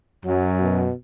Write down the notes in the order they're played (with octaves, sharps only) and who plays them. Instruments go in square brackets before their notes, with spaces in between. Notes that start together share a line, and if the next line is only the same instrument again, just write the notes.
[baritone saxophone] F#2 [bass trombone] F#3
[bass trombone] B2